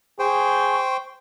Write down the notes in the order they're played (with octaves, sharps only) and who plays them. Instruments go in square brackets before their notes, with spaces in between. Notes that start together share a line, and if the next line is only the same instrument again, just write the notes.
[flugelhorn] G#4 [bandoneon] C5 G5 [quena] C#6